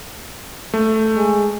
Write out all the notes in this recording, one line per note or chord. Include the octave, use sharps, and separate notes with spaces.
A3
G#3